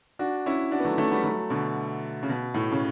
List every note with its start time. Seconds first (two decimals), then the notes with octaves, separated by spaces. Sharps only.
0.19 D4 F#4
0.46 C#4 E4
0.71 D4 F#4
0.80 B3
0.85 F#3 A3
0.97 A3 C#4
1.11 G3 B3
1.24 F#3 A3
1.50 B2 D3
2.23 C#3
2.29 B2
2.54 A2
2.72 C#3